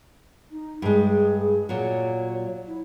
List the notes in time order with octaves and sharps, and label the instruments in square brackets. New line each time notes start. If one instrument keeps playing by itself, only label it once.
[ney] D#4
[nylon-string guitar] G2 G#3 [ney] G#4
[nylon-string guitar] A#2 F#3 [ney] C#5
[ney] E4